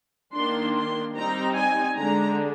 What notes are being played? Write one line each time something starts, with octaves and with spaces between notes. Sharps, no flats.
D#3 A#3 D4 C6
C6
G3 C4 D#4 A#5
G#5
D3 G#3 D4 A#5